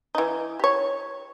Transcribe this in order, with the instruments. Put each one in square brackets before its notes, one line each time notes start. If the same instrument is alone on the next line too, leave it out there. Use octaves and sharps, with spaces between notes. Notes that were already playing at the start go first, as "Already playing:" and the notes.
[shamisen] E3 D#4
G4 C#5